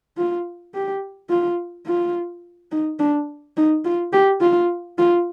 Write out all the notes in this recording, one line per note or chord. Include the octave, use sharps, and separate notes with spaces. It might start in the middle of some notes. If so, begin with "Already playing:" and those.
F4
G4
F4
F4
D#4
D4
D#4
F4
G4
F4
F4